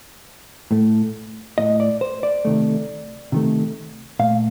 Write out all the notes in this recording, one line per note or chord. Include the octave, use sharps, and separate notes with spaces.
A2 A3
A2 A3 D#5
D5
C5
D5
C3 D#3 A3
C3 D#3 A3
A#2 A3 F5